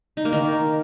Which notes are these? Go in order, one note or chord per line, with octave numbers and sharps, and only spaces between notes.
D#4
A#3
D#3